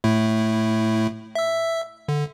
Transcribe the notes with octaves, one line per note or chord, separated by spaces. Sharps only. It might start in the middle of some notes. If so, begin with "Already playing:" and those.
A2 A3 E4
E5 E6
D3